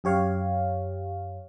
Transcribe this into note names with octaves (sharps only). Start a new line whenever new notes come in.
F#2 G4 C#5 F5